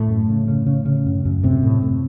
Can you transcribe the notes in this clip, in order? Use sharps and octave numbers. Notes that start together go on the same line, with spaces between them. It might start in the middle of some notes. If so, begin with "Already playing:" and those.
Already playing: A2 A3
F#2
C#3
C#3
C#3
C#3
F#2
F#2
A2 C3 C4
A2
A2